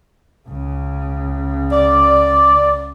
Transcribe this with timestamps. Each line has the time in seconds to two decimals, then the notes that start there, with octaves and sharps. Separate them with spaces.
0.49 C#2 C#3
1.72 D5